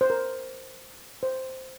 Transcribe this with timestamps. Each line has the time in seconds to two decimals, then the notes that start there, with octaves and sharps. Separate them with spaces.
0.01 C5
0.10 A#4
1.23 C5